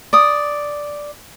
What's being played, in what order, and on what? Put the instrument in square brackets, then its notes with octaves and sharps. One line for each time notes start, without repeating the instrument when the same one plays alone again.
[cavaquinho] D5 D#6